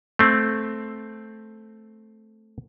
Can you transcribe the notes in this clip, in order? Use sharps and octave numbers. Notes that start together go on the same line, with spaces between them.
A3 C4